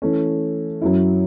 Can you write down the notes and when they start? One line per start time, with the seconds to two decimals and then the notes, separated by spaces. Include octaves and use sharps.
0.02 E3 A3 C#4
0.81 F#2 F#3 C#4 E4